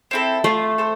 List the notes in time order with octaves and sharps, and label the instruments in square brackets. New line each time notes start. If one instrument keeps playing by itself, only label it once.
[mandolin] C4 E4 A4
[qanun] A3 [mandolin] F4
[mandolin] A4 C5